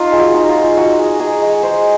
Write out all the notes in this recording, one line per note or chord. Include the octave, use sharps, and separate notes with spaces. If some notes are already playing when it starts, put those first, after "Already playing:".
Already playing: D#4 F4
G#3
F#4
D#4
F4
G#3
D#4 F#4
G#3
D#4 G#4
G#3
G#3 C5